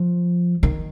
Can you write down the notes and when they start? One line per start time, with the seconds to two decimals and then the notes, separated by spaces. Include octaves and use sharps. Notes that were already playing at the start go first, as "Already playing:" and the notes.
Already playing: F3
0.63 D#3